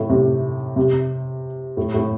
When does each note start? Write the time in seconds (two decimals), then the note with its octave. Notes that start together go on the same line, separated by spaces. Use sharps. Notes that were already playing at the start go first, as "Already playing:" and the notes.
Already playing: A2
0.09 C3
0.76 C3
1.77 A2
1.94 A2